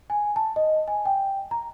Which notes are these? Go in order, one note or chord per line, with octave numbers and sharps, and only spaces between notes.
G#5
A5
D#5
G#5
G5
A#5